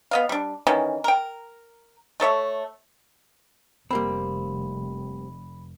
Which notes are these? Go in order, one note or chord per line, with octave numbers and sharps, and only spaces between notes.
B3 D#5 F5
G3 D4
D#3 E3 C#4
A#4 G5
A3 A4 C#5 E5
F1 G3 A#3 C4 B5